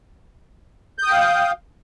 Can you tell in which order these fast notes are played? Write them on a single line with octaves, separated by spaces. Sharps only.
G6 D#6 G5 F5